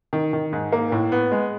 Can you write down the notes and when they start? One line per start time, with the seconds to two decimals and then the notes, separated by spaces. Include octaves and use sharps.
0.13 D#3
0.33 D#3
0.53 G#2
0.72 A#3
0.92 A2
1.12 B3
1.31 G#3